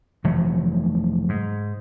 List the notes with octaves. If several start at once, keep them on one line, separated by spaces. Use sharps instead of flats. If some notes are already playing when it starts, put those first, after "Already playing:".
F1 E3 F#3 A3
G#2